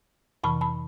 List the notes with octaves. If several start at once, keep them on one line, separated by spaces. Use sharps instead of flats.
F2 C3 E3 A5 B5
A5 B5